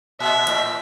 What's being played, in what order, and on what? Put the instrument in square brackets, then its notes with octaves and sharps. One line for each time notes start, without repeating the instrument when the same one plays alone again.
[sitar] A#2 [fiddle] E5
[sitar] A2